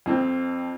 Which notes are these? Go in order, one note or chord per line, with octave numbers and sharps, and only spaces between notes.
F2 F3 C4